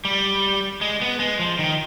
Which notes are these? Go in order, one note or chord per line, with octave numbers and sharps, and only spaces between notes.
G3
G#3
B3
G#3
F3
D#3